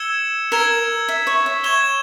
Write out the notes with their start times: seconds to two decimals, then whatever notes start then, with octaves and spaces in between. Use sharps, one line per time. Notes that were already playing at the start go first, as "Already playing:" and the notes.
Already playing: E6 G#6 C#7 E7 G7
0.52 A#4 E6 G#6 E7 G7
1.08 E5
1.27 C#5
1.46 E5
1.64 C#5 G#6 E7 G7